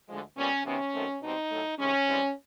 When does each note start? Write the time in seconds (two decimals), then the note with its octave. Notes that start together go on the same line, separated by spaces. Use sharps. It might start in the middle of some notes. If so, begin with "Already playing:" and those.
0.09 D2 D3 F3 G#3
0.37 A#2 G3 B3 C#4
0.65 C3 D#3 F#3 B3 C#4
0.94 F#2 D#3 F#3 A3 C4
1.22 B2 G3 C4 D#4
1.51 A2 F#3 A3
1.79 C3 D#3 G#3 C#4
2.07 G#2 E3 G3 C4